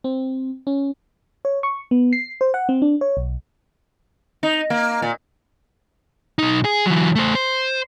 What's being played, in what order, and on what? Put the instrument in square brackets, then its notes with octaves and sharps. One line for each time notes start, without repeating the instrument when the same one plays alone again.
[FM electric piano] C4
C#4
C#5
C#6
B3
C7
C5
F#5
C4
D4
C#5
B1
[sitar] D#4
A#3
A#2
[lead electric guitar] B1 D#4
G#4
E3 F#3
A3 C5
C5